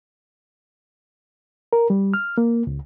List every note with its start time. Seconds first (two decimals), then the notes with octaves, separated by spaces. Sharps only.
1.73 A#4
1.90 G3
2.14 F6
2.38 A#3
2.67 C#2